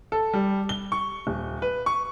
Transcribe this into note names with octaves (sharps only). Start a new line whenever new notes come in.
A4
G3
G7
C#6
D#1
B4
C#6